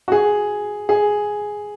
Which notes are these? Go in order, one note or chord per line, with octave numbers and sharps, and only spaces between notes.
F#4
G#4
G#4